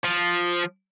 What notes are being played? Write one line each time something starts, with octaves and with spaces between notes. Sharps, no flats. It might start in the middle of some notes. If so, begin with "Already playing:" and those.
F3